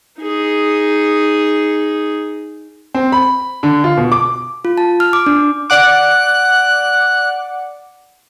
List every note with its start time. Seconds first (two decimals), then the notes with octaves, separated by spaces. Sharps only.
0.22 D#4 G#4
2.95 C4
3.12 B5
3.63 D3
3.84 F4
3.97 B2
4.12 D6
4.65 F4
4.78 A5
5.00 F6
5.13 D6
5.26 D4
5.70 D5 F#5 D6 F#6